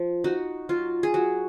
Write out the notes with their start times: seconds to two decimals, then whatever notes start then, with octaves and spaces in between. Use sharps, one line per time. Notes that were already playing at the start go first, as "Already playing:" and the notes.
Already playing: F3
0.24 D#4 F#4
0.69 F#3 F4
1.03 G#4
1.14 F#3 F#4